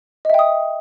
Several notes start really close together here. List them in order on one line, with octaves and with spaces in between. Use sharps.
D#5 E5 G5 D#6